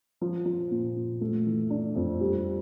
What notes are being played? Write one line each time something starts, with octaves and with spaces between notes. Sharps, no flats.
F3
F3
A#2
A#2
A3
E3
D4
F2
G3